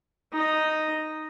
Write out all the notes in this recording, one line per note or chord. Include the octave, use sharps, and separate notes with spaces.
D#4 D#5